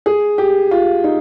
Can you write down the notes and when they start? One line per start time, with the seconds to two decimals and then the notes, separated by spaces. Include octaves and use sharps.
0.06 G#4
0.38 G4
0.71 F4
1.04 D#4